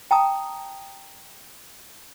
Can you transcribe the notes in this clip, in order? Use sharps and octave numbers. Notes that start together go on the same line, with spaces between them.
G5 A5 A#5 D#6